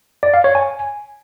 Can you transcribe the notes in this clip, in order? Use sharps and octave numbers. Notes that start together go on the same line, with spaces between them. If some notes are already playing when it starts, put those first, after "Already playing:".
D5
F5
C#5
G#5